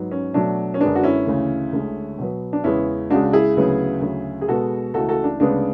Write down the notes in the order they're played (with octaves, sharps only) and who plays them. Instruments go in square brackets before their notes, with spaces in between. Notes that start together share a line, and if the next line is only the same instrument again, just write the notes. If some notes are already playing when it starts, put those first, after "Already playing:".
Already playing: [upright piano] G#2 F#3 B3
C#4
B2 F#3 A3 D4
C#4
F#2 D3 G#3 B3 D4
F#4
C#4 E4
D2 C#3 E3
D2 D3 G#3
B2 F#3 B3
D4
E2 C#3 G#3 B3 C#4 E4
C#2 C#3 G#3 D4 F#4
E4 G#4
D2 C#3 F#3 B3
D2 C#3 F#3
G#4
B2 G#3 B3 F#4 A4
C#2 C#3 E3 A3 F#4 A4
F#4 A4
D4
D2 C#3 G#3 B3 D4